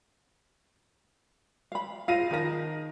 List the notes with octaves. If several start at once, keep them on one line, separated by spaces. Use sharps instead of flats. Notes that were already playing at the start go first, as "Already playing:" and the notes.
F5 B5
F4 C5 F5 A#6 D#7
D#3 D#4 A#4 A5 A#6